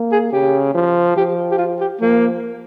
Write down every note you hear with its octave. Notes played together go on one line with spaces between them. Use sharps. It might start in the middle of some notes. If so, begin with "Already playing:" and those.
Already playing: A#3
G#4
C#3 G4
F3
F3 G4
G4
F4
G4
F3 A#3